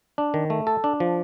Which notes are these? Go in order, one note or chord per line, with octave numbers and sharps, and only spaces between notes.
D4
D#3
A3
A4
D4
F3